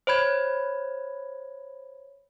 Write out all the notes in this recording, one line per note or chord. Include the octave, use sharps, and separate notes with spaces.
C5 C#5 B5 G#6